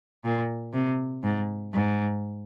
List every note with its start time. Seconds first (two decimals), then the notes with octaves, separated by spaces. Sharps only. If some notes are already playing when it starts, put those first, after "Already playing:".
0.24 A#2
0.73 C3
1.23 G#2
1.73 G#2